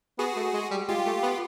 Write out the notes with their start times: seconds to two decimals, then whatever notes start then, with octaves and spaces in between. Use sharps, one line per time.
0.19 B3 F#4 G#4
0.36 A3
0.53 G#3
0.71 G3
0.89 G#3 F4 G4
1.06 A3
1.23 B3